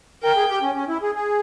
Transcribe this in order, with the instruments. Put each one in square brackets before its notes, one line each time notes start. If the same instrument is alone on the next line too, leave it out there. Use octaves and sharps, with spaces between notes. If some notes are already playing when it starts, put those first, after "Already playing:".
[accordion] A#4 [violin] G5
[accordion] G#4
G4
C#4
C#4
E4
G#4
G#4